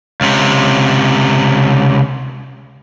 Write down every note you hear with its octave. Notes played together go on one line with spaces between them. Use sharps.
C#2 C3